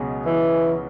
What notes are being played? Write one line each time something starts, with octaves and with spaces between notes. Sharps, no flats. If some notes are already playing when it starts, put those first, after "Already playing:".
Already playing: C#2 B2 F#3 C#4 G#4
E3